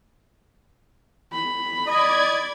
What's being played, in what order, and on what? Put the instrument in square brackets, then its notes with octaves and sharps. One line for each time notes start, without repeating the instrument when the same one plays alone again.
[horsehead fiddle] B5
[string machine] D5 G#6 [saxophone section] D#5